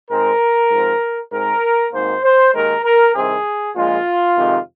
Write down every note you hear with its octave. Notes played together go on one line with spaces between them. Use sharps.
G#2 G#3 C4 A#4
G#2 F3 C4
G#2 G#3 C4 A#4
G#1 G#2 D#3 A#3 C5
C5
D#2 D#3 G#3 A#4
A#4
C2 C3 D#3 C4 G#4
A#1 A#2 G#3 F4
F2 C3 D#3 G#3